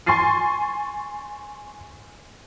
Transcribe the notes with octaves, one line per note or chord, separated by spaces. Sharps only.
G#5 C6 C#6 A6 C7 D#7